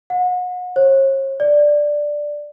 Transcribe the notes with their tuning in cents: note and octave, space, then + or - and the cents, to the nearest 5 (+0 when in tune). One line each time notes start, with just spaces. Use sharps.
F#5 -35
C#5 -40
D5 +5